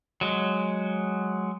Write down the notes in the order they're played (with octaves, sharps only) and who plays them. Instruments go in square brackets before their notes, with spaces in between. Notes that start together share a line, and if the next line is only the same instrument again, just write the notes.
[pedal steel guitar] F#3 G#3